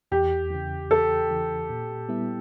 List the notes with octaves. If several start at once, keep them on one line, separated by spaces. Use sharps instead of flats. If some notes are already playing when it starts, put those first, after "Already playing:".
E2 G4
C#3 E3
E2 A4
C#3 E3
A#2
G3 B3 E4